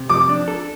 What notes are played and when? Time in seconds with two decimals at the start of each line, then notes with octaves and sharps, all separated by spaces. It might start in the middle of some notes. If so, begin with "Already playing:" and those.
Already playing: C3
0.09 F3 D6
0.29 D4
0.48 A4